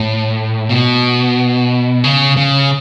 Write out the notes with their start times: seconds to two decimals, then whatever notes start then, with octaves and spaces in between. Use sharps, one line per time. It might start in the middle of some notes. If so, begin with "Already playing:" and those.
Already playing: A2
0.69 B2
2.04 C#3
2.37 C#3